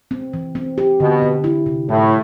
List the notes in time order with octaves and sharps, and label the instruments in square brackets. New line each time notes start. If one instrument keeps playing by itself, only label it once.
[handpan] C4
E3
C4
G4
[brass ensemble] B2 [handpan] D3
[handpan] D3
E4
C3
[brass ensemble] A2 [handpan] G3